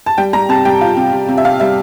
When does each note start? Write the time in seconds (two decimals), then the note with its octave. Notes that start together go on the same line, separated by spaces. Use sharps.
0.06 A5
0.18 G3 G5
0.33 G3 A#5
0.49 C3 A5
0.65 G3 G5
0.81 F4
0.97 C3
1.13 C3
1.29 C3
1.38 E5
1.44 C3 F5
1.60 G3 E5